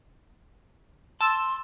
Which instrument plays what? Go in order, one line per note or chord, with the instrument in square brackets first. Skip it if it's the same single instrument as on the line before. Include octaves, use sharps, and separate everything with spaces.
[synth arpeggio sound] A5 E6 [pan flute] C6